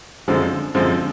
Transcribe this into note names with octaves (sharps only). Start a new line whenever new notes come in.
F#2 D3 F3 G#3 C4
F#2 D3 F3 G#3 C4